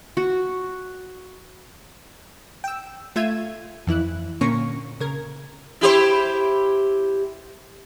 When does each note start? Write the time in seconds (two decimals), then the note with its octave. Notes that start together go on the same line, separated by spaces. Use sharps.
0.17 F#4
2.64 G5 E6
3.16 A3 F4 E5 E6 G#6 D#7
3.87 F2 E3 E4 F#6
4.41 A#2 D3 A#3 C#4 C#6
5.00 C#3 A#4 G#6
5.81 E4 G4 C5